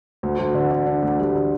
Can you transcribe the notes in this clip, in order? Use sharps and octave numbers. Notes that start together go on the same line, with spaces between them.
D2
D2
D3
D3
D4
D2
G3
D3